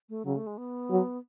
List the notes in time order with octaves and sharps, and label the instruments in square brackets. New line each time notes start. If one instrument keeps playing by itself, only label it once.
[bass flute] A3
[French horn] C#3 [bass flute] F#3
[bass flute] A3
G#3
B3
[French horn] F#3